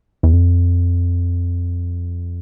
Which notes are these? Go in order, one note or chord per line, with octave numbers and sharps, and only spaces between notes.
E2
F2